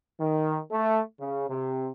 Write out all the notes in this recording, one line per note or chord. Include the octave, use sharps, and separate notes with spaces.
D#3
A3
C#3
C3